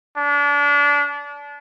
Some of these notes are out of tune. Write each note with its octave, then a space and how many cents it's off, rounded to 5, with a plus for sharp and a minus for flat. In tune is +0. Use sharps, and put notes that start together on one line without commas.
D4 -30